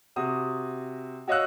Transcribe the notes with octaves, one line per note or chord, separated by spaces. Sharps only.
C3 F#4 D#6
F#4 C#5 D#5 F5 E6 F#6